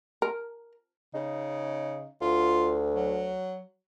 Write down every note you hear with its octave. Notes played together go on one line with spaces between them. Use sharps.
A#4
C#3 D#4
D2 F4
F#3